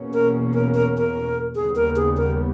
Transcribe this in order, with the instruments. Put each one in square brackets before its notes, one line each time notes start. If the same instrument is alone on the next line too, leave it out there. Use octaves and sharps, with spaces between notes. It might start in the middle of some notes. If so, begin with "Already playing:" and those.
Already playing: [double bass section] E2 B2 A#3 C#4
[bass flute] A#4
A#4
A#4
A#4
[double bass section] D#2 C#3 G3 B3 [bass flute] G#4
[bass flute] A#4
G#4
A#4